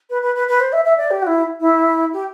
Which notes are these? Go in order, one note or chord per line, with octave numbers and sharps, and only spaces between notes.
B4
B4
B4
B4
C5
E5
E5
D5
G4
F#4
E4
E4
G4